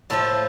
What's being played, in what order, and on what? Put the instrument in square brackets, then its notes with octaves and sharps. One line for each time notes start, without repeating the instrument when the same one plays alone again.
[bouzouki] A2 F3 A3 A4